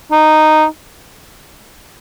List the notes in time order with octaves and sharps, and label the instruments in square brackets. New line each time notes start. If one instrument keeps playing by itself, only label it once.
[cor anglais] D#4